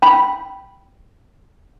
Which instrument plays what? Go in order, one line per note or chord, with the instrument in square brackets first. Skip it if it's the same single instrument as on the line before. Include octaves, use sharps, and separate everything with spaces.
[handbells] G5 B5